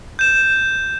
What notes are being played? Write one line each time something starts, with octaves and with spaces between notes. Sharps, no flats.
G6 E7